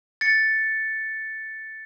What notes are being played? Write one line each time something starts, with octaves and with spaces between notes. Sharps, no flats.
A6 C#7